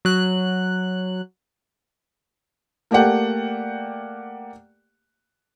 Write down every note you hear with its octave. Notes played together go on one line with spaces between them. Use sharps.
F#3 F#6
A3 A#3 G4 D5 F#5 G5